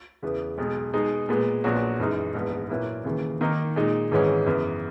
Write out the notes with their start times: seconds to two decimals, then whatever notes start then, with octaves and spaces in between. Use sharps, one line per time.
0.23 E2 C#3 E3 B3
0.58 B1 B2 G#3
0.93 B2 G#3 D#4 G#4
1.29 A#2 G#3 B3
1.64 A#1 A#2 F#3 B3 F#4
2.00 F#2 E3 G#3 D#4
2.34 A#1 G#2 E3 B3
2.69 A#2 F#3 A#3 E4 B4
3.04 D#2 C#3 E3
3.41 D#3 A#3 D#4 A#4
3.76 A#2 G#3 D#4
4.11 G#1 G#2 E3 G#3 C#4
4.46 F#2 C#3 E3 B3